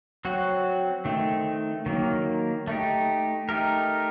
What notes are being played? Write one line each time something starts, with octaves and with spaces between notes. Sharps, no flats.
F#3 C4 F#4
D#3 A3 C4
D#3 F#3 A#3
A3 D#4 G4
A3 D#4 G4 A#4